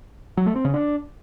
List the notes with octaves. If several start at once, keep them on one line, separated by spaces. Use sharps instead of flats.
F#3
A3
C4
C#3
D4